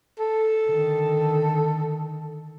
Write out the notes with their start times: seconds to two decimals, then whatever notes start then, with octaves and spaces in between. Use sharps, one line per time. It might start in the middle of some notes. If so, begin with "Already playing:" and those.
0.19 A4
0.67 D3 D#3